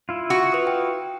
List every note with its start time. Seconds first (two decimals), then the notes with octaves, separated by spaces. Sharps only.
0.09 E4 F4
0.30 F#4
0.52 B4 D#6
0.67 G5